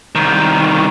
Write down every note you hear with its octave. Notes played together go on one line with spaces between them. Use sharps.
C2 D#3